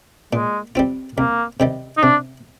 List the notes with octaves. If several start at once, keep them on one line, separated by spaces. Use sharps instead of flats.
A#2 G#3
G3 C4 F4
C2 A#3
C3 D#3 G3
D#4
C3 D4